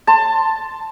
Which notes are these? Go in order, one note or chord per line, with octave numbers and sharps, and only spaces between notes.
A5 C6